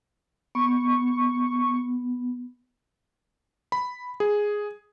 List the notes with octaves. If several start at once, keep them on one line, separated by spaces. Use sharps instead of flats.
B3 C#6
B5
G#4